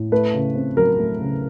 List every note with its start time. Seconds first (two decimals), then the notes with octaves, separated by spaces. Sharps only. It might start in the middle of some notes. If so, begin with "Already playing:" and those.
Already playing: A2
0.12 A3 B4
0.34 C#3
0.55 C4
0.77 F#3 A#4
0.99 A3
1.20 C#3